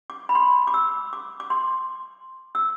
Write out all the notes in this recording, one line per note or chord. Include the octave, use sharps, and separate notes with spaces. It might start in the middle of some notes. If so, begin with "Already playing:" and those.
D6
B5
C6
D6
E6
D6
D6
C6
E6